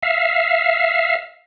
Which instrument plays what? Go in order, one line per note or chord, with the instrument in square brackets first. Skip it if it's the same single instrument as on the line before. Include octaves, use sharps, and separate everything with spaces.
[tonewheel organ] E5 F5